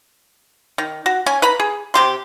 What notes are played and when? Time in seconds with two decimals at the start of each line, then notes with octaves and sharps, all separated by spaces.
0.78 D#3
1.06 F#4
1.26 C#4 G#5
1.42 B4 A#5 B5
1.60 G#4
1.94 C3 G4 C6